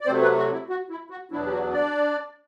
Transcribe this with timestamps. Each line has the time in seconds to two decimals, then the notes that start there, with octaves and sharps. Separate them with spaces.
0.01 D5
0.06 C3 F#3 A3 C4 C5
0.22 B3 B4
0.38 F#4
0.53 E4
0.69 F#4
0.90 E4
1.10 F#4
1.31 E2 B2 F#3 B3 D4 E4
1.46 G4
1.52 F#4
1.72 D4 D5